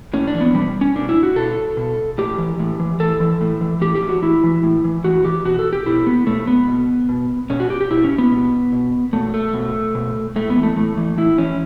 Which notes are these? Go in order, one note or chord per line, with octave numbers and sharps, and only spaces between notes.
A2 C#4
D4
E3
B3
B2 G3
C#4
B2 D4
E4
F#4
B2 A4
B2
A2 G4
E3
A2
E3
A2 A4
E3
A2
E3
A2 G4
G4
E3
F#4
A2 E4
E3
A2
E3
A2 F#4
E3 G4
B2 F#4
A4
G4
B2 E4
B3
B2 A3
B3
B2
B2
B2 C#4
F#4
G4
G4
B2 E4
C#4
B3
B2
B2
B2 A3
A3
B2
B2
A2 A3
B3
E3
A3
A2 A3
E3
A2 E4
E3 C#4